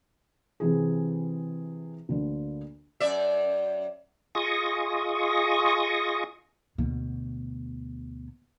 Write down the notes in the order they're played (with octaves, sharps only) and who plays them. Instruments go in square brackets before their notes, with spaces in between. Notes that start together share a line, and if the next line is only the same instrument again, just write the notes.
[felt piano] C3 E3 G#4
D2 D3 A#3
[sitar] F#2 D5 E5
[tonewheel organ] F4 G#4 D#5 C#6 D#6
[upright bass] D2 B2